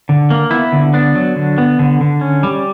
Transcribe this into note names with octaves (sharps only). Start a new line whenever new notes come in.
D3
A#3
B3 E4
D3
B3 D4
F#3
D3
B3
D3
D3
C#4
G3